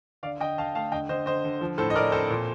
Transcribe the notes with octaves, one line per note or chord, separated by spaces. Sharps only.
D3 D5 F5
D3 D#5 G5
D3 F5 A5
A3 F5 A5
D3 D#5 G5
D3 C5 D#5
D3 C5 D#5
D3
F3
A2 A4 C5
D#5
A2 A#4 D5
C4 A4 C5
A#2